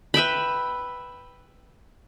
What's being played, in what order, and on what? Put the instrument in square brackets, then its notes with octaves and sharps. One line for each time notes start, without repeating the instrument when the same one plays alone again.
[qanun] B4 E5 G5 B5